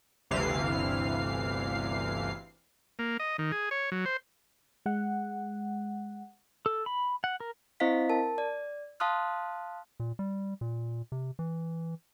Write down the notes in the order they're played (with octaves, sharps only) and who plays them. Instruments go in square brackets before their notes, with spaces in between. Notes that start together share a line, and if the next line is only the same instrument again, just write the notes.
[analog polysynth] G1 D2 C3 E3 F5 C7
[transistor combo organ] A#3
D#5
D#3
G#4
C#5
F#3
C5
[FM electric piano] G#3 F#5
[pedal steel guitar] A4
B5
F#5
A#4
[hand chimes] C4 E4 C5 D#5 F5 B6
A#4 A5
D5
F5 A5 C6 D#6 F6 F#6
[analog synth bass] A#2
G3
A#2
C3
E3